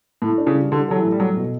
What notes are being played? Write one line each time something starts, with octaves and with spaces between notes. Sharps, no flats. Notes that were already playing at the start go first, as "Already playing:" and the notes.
A2 A4
D4
C#3
G3
D3 G3
F#3 A4
E3
A2
G3
F#3 A4
B2